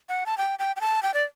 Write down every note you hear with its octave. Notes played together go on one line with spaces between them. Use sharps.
F#5
A5
G5
G5
G5
A5
G5
D5